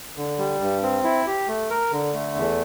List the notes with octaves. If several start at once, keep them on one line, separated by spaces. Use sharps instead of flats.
D3
G3
G2
C4
E4
G4
A3
A#4
D3
A3
E2